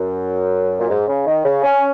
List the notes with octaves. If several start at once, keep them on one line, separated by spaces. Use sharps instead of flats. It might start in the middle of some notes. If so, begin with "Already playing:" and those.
Already playing: F#2
A#2
G#2
C#3
D#3
C#3
C#4